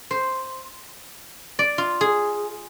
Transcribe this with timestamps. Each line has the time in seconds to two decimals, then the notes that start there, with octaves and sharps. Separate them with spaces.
0.11 C5
1.59 D5
1.78 F4
2.01 G#4